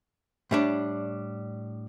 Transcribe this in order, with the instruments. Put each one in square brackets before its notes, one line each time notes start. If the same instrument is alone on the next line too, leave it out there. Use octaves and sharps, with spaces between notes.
[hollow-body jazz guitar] A2 G3 D4